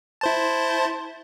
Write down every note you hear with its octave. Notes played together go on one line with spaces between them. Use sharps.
E4 C5 A5